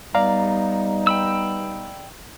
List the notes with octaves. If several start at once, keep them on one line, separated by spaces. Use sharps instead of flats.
G3 B3 D#4 D5 F5 A#5
G5 B5 E6